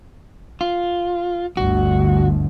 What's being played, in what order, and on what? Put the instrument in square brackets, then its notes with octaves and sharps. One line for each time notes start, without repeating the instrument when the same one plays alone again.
[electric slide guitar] F4
[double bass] G1 D2 [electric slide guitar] F#4